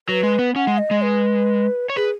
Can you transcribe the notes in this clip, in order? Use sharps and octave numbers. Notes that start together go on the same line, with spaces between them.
F#3 B4
G#3
B3
C#4 F#5
G#3
D#5
G#3
B4
C#5
G#4 B4